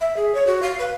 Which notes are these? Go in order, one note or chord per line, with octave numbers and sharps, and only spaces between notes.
E5
G#4
C#5
F#4
F5
B4